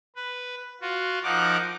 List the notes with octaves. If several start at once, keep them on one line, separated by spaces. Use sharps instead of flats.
B4
F4 F#4
F3 D#4 A#4 F#5 D6